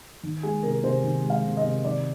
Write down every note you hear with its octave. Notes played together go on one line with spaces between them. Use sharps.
D#3
G#3 G#4
C3 A#4
C3 C5
D#3
G#3
F5
C3
D#5
C3
D#3 D5